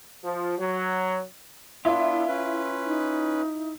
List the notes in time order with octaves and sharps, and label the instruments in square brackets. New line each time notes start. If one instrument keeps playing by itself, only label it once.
[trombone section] F3
F#3
[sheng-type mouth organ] B3 D4 [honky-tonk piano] E4 E5 [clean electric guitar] F4
[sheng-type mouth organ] C#4 B4
[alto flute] D#4